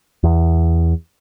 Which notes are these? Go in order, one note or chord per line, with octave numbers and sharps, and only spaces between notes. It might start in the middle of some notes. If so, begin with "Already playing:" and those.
E2